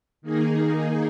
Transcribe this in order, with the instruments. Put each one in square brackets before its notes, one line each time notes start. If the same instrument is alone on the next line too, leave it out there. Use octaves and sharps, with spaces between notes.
[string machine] D#3 A#3 D#4 G#4